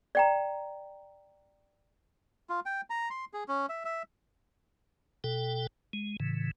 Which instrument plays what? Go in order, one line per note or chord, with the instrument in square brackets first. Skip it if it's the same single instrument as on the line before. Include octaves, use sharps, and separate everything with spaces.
[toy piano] D5 G5 A#5
[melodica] F4
G5
A#5
C6
G#4
C#4
E5
E5
[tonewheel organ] B2 A4 G5
G#3
A2 C#3 E3